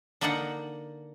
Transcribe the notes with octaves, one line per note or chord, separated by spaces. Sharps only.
D3 A#3 D#4 D5 D#5 F#5